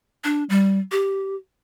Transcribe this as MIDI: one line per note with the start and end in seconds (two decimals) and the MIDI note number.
0.24 0.44 62
0.50 0.78 55
0.92 1.35 67